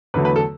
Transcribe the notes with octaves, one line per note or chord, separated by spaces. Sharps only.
E2 D3 F#3 A3 B4
B4
A4